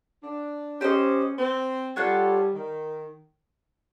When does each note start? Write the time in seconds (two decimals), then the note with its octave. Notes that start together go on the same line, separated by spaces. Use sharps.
0.23 D4
0.80 C#4 G4 C5 D#5
1.38 C4
1.96 G3 F4 A4 C#5 F#5
2.54 D#3